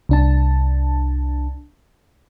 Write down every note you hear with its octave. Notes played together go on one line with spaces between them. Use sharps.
C2 D4 A5